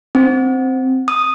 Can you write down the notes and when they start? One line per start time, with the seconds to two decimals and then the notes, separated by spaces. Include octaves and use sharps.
0.15 C4
1.08 D#6